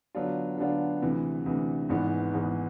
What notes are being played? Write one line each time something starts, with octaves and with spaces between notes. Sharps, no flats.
D3 F#3 B3 D4 F4
D3 F#3 B3 D4 F4
D2 C3 E3
D2 C3 E3
G#1 G#2 E3 G#3 B3
G#1 G#2 E3 G#3 B3